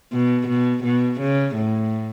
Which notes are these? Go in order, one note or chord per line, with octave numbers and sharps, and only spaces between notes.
B2
B2
B2
C#3
A2